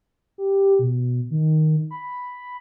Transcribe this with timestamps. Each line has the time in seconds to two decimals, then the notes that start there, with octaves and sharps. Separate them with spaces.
0.38 G4
0.79 B2
1.31 D#3
1.91 B5